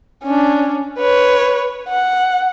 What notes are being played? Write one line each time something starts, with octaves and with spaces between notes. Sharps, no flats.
C#4 D4
B4 C#5
F#5